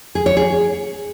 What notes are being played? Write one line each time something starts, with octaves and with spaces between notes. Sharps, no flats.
G#4
C#5
G#4